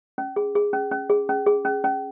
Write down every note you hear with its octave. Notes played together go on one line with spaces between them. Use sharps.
C#4
G#4
G#4
C#4
C#4
G#4
C#4
G#4
C#4
C#4